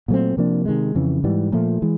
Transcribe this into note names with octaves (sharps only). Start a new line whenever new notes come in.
A#2 F#3 A3 C4
C3 F3 A#3 D4
C3 D#3 G#3
F2 C#3 E3
G#2 E3 G3
A#2 F3 A3
E3 G#3